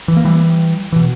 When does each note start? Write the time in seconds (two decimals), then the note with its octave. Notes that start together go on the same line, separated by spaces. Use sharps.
0.08 E3
0.17 A#3
0.25 E3 G3
0.92 B2 E3